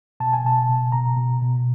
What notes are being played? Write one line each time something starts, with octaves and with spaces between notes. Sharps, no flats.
B2 A5
G#5
B2 A5
B2
B2 A#5
B2
B2